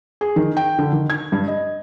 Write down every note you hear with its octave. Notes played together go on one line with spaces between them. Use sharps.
G#4
D#3
G5
D3
D#3
G#6
G2
D#5